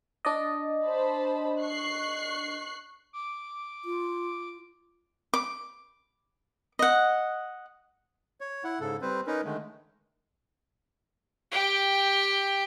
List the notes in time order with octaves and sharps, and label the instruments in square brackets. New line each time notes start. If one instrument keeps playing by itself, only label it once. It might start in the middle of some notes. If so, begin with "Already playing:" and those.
[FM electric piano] D4 D5 D#5
[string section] C5 A5 B5
C#6 F#6 C7
[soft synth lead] D6
[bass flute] F4
[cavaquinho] D6
D#5 F#5
[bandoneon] C#5
E4 F#5
G#2 C#3 A4
G3 C4 B4 C5
C#4 D#4 A#4 B4
D3 D#3 G#3 A3
[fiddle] G4 G5